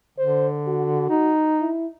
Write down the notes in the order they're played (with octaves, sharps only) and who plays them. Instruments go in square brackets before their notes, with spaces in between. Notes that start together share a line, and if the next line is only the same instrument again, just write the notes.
[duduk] D3 [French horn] C5
[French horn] F#4
[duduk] D#4
[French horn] E4